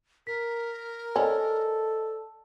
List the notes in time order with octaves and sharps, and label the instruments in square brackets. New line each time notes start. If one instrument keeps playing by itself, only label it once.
[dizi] A#4 [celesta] B6
[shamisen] C#4 [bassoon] A4 [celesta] C5 D5 D#5